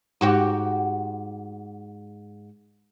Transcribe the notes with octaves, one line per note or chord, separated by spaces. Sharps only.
G#2 F#4 G4